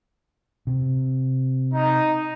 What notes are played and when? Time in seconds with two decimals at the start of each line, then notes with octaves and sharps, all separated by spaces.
0.67 C3
1.73 D#4